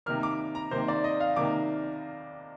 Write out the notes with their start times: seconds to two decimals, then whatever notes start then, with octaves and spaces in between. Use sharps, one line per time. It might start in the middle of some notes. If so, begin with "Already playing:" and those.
0.06 C3 D#3 A#3 F6
0.23 D6
0.55 A#5
0.71 C3 D#3 A#3 C5
0.88 D5
1.04 D#5
1.20 F5
1.36 C3 D#3 A#3 D6